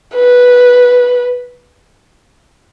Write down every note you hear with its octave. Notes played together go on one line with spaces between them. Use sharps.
B4